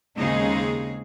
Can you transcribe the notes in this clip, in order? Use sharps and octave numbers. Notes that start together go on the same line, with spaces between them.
D#2 C#3 G#3 C4 D#4 G#4